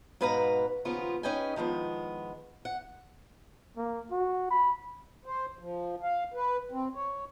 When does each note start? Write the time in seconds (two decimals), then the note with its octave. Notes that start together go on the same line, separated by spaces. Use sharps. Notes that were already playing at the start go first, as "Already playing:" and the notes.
0.21 G#2 B2 B4 F5 F#5 A#5
0.85 D#2 C#3 F3 B3 F4 A#4
1.23 C#4 D#4 G#4 B4 G5 G#5
1.56 D#3 F3 G#3 B3
2.65 F#5
3.77 A#3
4.11 F#4
4.51 B5
5.26 C5
5.59 F3
6.03 F5
6.34 B4
6.72 C4
6.95 C#5